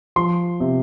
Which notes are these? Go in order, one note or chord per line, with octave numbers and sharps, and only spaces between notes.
F3 C6
C3